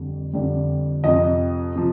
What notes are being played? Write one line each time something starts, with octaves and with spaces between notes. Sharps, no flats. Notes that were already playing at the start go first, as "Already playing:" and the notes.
Already playing: F2 D3 G3
F2 D3 G3
F2 C3 F3 D#5
C3 F3